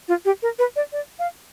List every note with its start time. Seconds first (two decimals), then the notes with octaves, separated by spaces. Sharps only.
0.08 F4
0.25 G4
0.42 A#4
0.59 B4
0.76 D5
0.92 D5
1.19 F5